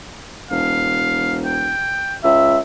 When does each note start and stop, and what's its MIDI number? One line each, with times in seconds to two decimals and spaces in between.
0.51 1.78 28
0.51 1.37 77
1.45 2.16 79
2.24 2.58 37
2.24 2.59 76